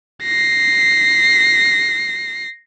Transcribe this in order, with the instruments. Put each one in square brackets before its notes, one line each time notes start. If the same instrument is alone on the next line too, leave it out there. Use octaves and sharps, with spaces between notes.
[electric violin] A#6 C7